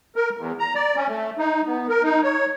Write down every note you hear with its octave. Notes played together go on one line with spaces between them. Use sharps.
A#4
E2
A#5
D5
C#4
A3
D#4
B3
A#4
D#4
C#5